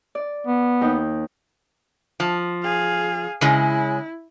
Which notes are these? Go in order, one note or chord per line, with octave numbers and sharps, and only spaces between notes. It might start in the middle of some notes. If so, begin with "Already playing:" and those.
D5
B3
D#2 D#4 G5
F3
G#4 F5
C#3 G#3 E4